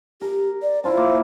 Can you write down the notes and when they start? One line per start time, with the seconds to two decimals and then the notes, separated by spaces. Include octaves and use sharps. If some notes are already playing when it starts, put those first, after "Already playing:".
0.21 G4 A#4
0.62 D5
0.84 E4 F4 C5 A5
0.97 A#3